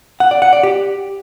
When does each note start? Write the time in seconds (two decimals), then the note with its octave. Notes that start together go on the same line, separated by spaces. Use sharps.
0.20 F#5
0.31 D5
0.42 F#5
0.53 D5
0.63 G4